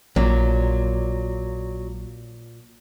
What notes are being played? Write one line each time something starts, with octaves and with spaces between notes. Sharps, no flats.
A#1 A#2 F#3